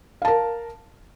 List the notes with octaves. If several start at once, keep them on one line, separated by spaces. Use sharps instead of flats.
A#4 F5 A5